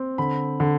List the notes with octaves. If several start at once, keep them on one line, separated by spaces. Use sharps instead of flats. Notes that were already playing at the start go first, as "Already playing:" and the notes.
Already playing: C4
D3 B5
D3